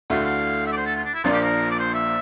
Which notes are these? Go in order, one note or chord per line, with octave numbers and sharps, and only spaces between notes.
D2 D3 A3 E4 F5
F5
E5
D5
C5
A4
F4
D4
E4
A#1 A#2 F3 A#3 D4 F4
G4
A#4
D5
C5
E5